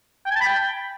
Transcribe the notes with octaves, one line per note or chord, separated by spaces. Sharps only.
G5
G#5
A5
B5
G5